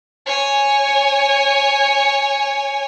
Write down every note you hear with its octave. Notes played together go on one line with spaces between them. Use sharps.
C#5 G#5